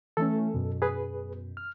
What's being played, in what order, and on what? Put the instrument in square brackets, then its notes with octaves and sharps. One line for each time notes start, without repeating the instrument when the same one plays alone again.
[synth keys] E3 A3 C#4 [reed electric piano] A4
[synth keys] F#2 B2
[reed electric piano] G#4 B4
F6